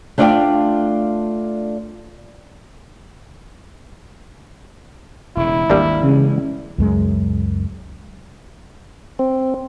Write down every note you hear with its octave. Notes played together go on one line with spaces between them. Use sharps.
A3 D4 F4 D5 F5 G5
E1 C#3 E4
G#1 D#2 G3 A#3 D4
C#3 E3 G#3
C#2 F#2 G#3
C4